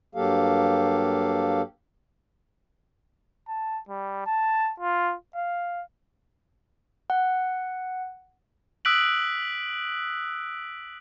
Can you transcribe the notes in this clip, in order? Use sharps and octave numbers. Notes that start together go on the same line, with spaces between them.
G2 F#3 A#3 G4 A4 F5
A5
G3
A5
F4
F5
F#5
D#6 E6 F#6 B6 D7 F#7